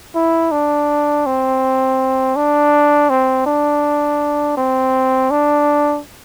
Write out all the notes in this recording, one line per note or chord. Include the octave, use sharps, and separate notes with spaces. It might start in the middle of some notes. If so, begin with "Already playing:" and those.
E4
D4
C4
D4
C4
D4
C4
D4